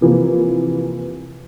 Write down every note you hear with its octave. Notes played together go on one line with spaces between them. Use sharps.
C3 E3 F3 A#3